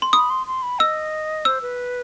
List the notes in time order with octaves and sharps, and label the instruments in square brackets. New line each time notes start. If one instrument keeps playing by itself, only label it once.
[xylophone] C6
[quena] B5 [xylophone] D#6
[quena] C6
C6
B5
[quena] D#5 [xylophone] E6
[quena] C5 [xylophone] E6
[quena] B4